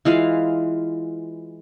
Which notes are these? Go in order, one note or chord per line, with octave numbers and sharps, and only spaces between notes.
E3 G#3 F4 F5